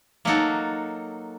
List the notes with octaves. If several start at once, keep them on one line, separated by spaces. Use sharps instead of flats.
F#3 A#3 D#4 F#4 A4